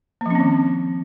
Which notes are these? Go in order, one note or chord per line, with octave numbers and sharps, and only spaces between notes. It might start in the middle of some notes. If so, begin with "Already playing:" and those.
D#3 F3 A#3 C4 C#4